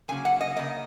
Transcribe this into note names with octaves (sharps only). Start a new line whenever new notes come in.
F#2 C#3 F#3 A#3 G#5
F#5
D#5
C#3 A#3 D#5